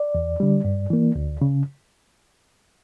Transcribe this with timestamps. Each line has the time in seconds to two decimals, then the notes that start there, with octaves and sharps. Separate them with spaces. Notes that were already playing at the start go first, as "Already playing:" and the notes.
Already playing: D5
0.15 E2
0.40 D3 G3
0.65 G2
0.90 E3 A#3
1.16 D2
1.42 C#3